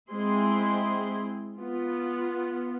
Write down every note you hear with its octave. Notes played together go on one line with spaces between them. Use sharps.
G#3 C4 E4 G#4 C6
B3 F4